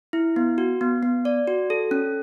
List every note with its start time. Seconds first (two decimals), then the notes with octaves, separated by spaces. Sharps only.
0.13 E4
0.36 B3
0.58 F#4
0.81 B3
1.03 B3
1.25 D5
1.47 F#4
1.70 A4
1.91 C#4